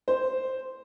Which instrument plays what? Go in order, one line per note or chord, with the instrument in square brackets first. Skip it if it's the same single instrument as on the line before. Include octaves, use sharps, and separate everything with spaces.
[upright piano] C5